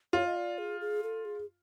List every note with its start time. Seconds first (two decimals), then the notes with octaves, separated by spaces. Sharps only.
0.13 F4 C#5
0.26 D#5
0.36 D5
0.58 G#4
0.81 G#4
1.03 A4
1.25 G#4